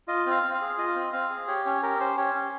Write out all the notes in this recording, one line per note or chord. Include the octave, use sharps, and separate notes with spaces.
F4 D#5
C4 F5
C4
F5
G#4
F4 D#5
C4
C4 F5
G#4
G4 C#5
C#4 C#5
G4 A#4
C#4 C5
G4 C#5
C#4